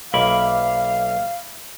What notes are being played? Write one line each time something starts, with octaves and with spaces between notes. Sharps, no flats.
B1 A#3 E5 F5 B5 D6